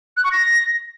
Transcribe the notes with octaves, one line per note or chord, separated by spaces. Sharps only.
F#6
C#6
A#6